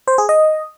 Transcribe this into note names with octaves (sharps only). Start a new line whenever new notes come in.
C5
G#4
D#5